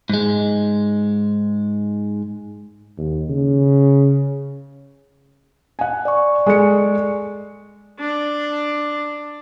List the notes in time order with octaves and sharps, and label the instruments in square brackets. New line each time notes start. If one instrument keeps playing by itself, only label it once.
[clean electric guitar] G#2 G#3
[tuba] D#2
C#3
[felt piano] F#5 G#5
[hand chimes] D5 C#6
[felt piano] G#3 A4 C#7
[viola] D4